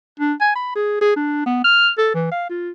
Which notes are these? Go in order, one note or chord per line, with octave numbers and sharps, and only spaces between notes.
D4
G#5
B5
G#4
G#4
D4
B3
F6
A4
E3
F5
F4